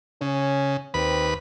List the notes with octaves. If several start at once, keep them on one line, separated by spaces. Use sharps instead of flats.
C#3 C#4
D#2 C4 B4 B5